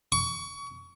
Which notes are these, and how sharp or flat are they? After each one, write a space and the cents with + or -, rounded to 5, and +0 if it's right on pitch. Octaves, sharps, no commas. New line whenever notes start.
C#6 +30